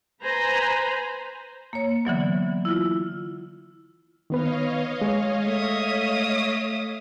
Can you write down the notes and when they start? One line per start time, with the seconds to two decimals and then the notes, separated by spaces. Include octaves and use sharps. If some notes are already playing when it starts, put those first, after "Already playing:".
0.22 B4 C5 G#5 A#5 B5
1.73 A#3 C#5
2.05 D3 E3 F#3 B3
2.65 E4 F4
4.30 D#3 B3 B4 C#5 D#5 F5
5.02 G#3
5.46 A3 E5 D#6